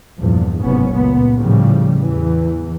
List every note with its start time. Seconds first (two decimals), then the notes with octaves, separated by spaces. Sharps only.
0.19 E2 G2 A#2 F3
0.61 F#1 G#2 C3 B3 C#4
0.91 C#2 A#2 B3
1.37 A2 C#3 F3 G3
1.99 E2 E3